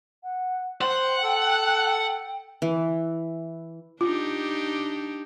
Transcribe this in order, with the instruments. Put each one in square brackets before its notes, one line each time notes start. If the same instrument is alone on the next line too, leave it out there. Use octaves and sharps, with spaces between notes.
[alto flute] F#5
[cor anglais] C5 [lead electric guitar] F#5 [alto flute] G5
[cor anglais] A4
[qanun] E3
[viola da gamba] D4 D#4 G4 [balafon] F4